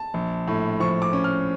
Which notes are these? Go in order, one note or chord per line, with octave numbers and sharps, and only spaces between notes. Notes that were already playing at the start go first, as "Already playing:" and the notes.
Already playing: A5
A#1
A2
F3 C#6
D6
C#4
F6